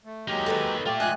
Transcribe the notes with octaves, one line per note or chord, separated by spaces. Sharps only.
A3
F#3 G#3 A#3 D#4 G4
A4 B4 C#5
A3 F4 G4 D5
G#2 F3 G#5 F#6